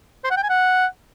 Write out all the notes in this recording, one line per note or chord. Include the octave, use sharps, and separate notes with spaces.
C5
F#5
G5
G#5
F#5